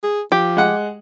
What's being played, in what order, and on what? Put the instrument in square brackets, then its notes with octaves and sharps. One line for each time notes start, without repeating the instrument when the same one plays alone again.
[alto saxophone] G#4
[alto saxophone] F3 [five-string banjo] G4
[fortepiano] G#3 F#5